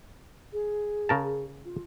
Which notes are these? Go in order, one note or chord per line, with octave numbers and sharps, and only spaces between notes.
G#4
C#3 A#4 A5
F4